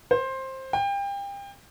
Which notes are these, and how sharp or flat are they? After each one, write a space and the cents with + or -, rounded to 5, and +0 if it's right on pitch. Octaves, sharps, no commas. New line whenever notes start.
C5 +15
G5 +30